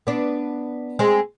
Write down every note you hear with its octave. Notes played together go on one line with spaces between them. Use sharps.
B3 D4
G#3 C4